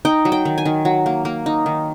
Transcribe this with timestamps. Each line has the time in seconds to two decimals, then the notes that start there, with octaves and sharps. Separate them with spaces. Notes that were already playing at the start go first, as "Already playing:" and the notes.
0.05 D#4 G5
0.25 F#3
0.32 G5
0.45 D#3
0.58 G#5
0.66 D#3
0.85 F#3
1.06 A#3
1.25 A#3
1.46 D#4
1.66 D#3